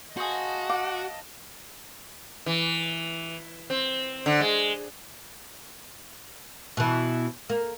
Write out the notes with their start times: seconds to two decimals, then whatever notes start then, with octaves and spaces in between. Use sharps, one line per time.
0.17 F#4 G#4 C5 D#5 F5 A5
0.69 F#5 D6
2.46 E3
3.70 C4
4.26 D3
4.40 G#3
6.77 B2 E3
7.50 A#3